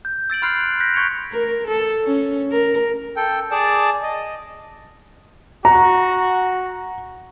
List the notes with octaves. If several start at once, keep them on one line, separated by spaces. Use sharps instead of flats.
G6
E6 A6 D7 F#7
B5 C6 F6 F#6 C7
A6
F#6 G6 A#6 B6 D7
C6 C#6 G#6 C#7 D7 F7
A#4
A4
C#4
A#4
A4 G5
G#4 D5 A5
D#5
F#4 A#5